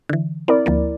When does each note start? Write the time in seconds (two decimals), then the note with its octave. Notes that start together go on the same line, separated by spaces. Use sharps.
0.09 D3 E3
0.48 C4 E4 A#4 D5
0.66 D2 F3 A#3